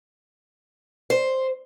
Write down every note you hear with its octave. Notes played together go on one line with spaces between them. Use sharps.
C5